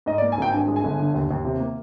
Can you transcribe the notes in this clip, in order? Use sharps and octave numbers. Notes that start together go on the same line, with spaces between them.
G#2 D#5
D5
A#3
G#5
G#1 G5
G2 G#5
G#3
G#5
G1
D3
D#2
D#2
C3
A#3